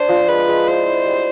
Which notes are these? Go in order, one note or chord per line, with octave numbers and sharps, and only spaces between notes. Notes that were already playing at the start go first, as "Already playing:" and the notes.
Already playing: D4 C5
F3
G#3 B4
G#3
E4 C5
E4
G3